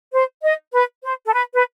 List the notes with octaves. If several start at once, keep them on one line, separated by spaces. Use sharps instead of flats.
C5
D#5
B4
C5
A4
B4
B4